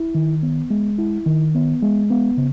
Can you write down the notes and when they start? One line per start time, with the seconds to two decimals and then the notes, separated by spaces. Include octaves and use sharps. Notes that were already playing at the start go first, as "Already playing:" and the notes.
Already playing: E4
0.15 D#3
0.43 B3
0.71 G#3
0.99 E4
1.26 D#3
1.55 B3
1.82 G#3
2.10 B3
2.38 C#3